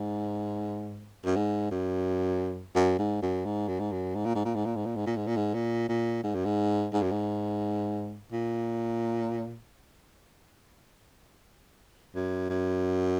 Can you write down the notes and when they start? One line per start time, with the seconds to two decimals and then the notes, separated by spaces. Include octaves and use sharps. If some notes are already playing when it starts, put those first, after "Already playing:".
Already playing: G#2
1.25 F#2
1.36 G#2
1.71 F#2
2.76 F#2
2.99 G#2
3.22 F#2
3.45 G#2
3.68 F#2
3.80 G#2
3.92 F#2
4.15 G#2
4.25 A#2
4.35 G#2
4.45 A#2
4.55 G#2
4.66 A#2
4.76 G#2
4.86 A#2
4.96 G#2
5.07 A#2
5.17 G#2
5.27 A#2
5.37 G#2
5.54 A#2
5.89 A#2
6.24 G#2
6.35 F#2
6.45 G#2
6.94 G#2
7.02 F#2
7.11 G#2
8.33 A#2
12.15 F#2
12.50 F#2